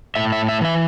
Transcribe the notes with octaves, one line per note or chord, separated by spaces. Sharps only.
A2 E5
E5
E5
E3 E5